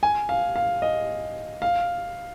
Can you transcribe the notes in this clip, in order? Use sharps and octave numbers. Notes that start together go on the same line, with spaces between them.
G#5
F5
F5
D#5
F5